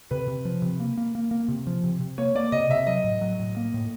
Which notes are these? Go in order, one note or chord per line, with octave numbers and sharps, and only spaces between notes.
C3 B4
C3
F3
C3
A#3
A#3
A#3
A#3
C3
F3
C3
C3
A#3 C#5
A#3 D5
C3 D#5
C3 E5
F#3 D#5
A2
F#3
A2
A#3
A2